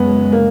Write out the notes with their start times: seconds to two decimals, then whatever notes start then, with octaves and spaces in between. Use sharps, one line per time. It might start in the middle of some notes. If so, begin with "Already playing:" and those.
Already playing: F#2 C#3 G#3 B3
0.32 A#3